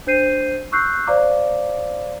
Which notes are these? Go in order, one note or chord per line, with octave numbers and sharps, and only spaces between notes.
D4 C5 G6 C7 D#7
C#6 E6 F#6 G6 C7
C5 D5 F5 A#5 D6